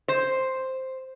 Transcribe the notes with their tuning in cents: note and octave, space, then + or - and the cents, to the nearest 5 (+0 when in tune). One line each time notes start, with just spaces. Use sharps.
C5 +0